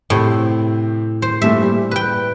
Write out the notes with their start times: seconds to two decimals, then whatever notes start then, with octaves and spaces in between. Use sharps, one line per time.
0.10 A2 C3 C4
1.22 C5
1.42 G2 A#2 A3 E5
1.62 G3
1.91 B4 G5